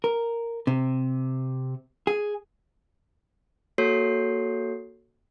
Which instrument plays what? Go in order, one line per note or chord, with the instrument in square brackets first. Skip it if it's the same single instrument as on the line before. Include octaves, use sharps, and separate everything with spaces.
[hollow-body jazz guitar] A#4
C3
G#4
[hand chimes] A#3 F#4 A4 C#5 C7